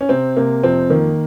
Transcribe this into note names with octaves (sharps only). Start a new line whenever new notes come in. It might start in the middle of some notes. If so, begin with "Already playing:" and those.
C#4
C3 C4
C3 A#3
F2 C4
D#3 A#3